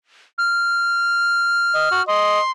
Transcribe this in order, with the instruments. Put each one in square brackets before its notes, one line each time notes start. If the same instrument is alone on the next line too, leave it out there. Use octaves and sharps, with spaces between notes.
[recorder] F6
[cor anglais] D#5
F#4
[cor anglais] D#5 [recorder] C6